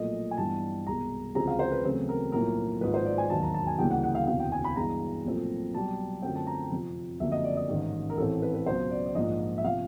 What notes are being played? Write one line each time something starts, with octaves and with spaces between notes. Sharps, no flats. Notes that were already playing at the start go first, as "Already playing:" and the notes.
Already playing: B1 A#2 F3 A3 D#5
G#5
G2 E3 G3 B3 A5
C2 B2 G#3 A#5
D2 C#3 F3 G#3 C4 A#5
F5
C5
B4
E2 C#3 F#3 A3 C4
A#4
B1 A2 F3 A#3 A#4
G#1 G#2 F3 B4
C5
D5
G#5
E1 D#2 D#3 F#3 A5
A#5
A5
G#5
D2 C#3 E3 G3 A#3 G5
F#5
F#5
F5
E1 D2 C3 E3 F5
G5
G#5
B5
G2 E3 G#3 B3 A#5
B1 A#2 F3 A3 C4
B1 B2 G3 A5
F#2 D3 F3 A3 C4 G5
A5
A#5
F2 C3 F3
F#1 F2 D3 F#3 A#3 E5
D#5
D5
D#5
A1 G#2 D#3
A#4
A1 A2 E3 A3 C4 A4
B4
B4
C#2 B2 F#3 C5
D5
D5
A#1 G#2 F3 A#3 D#5
E5
C3 F3 F5